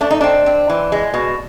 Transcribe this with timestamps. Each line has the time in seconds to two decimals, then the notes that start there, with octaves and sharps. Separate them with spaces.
0.01 A3 D4
0.11 D#4
0.21 C4 D4
0.46 C4
0.70 E3
0.92 G#3
1.14 B2